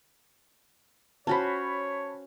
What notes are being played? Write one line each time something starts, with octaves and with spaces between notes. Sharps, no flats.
C#4 F#4 C5 C#5 A5 B5